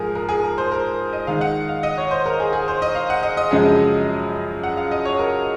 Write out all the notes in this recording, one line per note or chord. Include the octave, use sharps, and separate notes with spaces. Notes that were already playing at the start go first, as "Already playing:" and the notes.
Already playing: G#2 F3 G#4 A#4
A#4
G#4
A#4
C5
A#4
D#5
D#3 G#3 D#4 F5
F#5
F5
D#5
C#5
C5
A#4
G#4
G#4
C5
D#5
F5
F#5
D#5
D#5
F#2 C#3 F3 G#3
F#5
F5
D#5
C#5
A#4